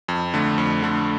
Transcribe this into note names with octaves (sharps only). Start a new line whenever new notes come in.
F2
D3 A3
F2
D3 A3